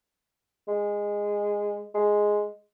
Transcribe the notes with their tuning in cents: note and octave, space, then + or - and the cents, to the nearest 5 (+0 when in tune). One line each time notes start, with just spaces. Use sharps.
G#3 -15
G#3 +0